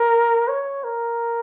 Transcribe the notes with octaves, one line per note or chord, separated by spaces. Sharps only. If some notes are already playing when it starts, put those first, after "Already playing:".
Already playing: A#4
C#5
A#4